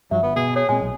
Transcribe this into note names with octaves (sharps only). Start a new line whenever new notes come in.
G2 F3 F#3 E5
G1 B3
B2 G#4
G#4 C#5
A#2 G#3 C4 G#5
B1